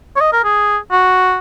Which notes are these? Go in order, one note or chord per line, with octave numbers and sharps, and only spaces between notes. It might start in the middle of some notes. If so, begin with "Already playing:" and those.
C#5
D#5
A#4
G#4
F#4